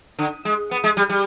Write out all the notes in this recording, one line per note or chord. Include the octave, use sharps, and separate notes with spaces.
D3
G#3
B3
G#3
G3
G3